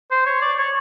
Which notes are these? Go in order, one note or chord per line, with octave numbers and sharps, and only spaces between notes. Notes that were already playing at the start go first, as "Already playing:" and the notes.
C5
C#5
D5
C#5